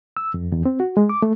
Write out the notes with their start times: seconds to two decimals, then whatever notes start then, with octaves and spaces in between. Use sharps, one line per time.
0.17 E6
0.34 F2
0.52 E2
0.65 C4
0.80 F#4
0.97 G#3
1.09 D6
1.22 A3